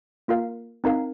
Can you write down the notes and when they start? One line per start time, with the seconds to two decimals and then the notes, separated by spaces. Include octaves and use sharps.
0.28 A#3 F4 A#4 F5
0.84 C4 D#4 A#4 F5